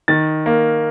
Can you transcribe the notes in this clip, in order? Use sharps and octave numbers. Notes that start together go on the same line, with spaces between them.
D#3 A6
A#3